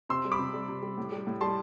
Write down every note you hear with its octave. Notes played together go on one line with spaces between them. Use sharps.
C3 C6 E6
G3
B5 D6
C3
G3
C3
G3
A2
G3
A2
G3 A5 C6